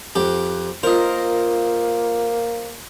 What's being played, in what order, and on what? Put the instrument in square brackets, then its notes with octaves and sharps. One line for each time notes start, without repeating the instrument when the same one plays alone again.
[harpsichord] F2 G4
[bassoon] A#3 [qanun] F4 A#4 [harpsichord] C5 D#5